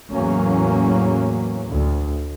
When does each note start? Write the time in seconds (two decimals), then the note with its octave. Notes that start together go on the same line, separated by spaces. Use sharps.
0.13 E2 A2 F#3 A#3 C#4
1.71 D2